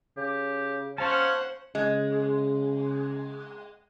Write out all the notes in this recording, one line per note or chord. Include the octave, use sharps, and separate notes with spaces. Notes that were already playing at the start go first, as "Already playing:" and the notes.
C#3 G4
C#4 C5 C#5 F5 F#5 A5
C#3 G#3